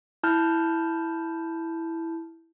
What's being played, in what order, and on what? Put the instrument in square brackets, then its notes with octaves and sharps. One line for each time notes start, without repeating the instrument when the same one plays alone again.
[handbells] E4 A5 F6 G6